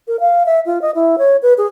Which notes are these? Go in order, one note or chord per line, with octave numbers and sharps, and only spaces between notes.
A#4
F5
E5
F4
D#5
E4
C#5
B4
G#4